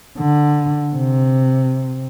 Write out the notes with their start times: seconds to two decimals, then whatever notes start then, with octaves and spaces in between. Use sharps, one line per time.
0.19 D3
0.95 C3